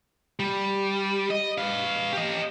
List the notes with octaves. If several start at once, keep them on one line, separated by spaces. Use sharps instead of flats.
G3
D#5
B4 F5
G4 D#5